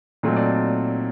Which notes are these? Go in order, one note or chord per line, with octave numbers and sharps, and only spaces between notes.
A#2 F#3 A3 C4 D#4
D5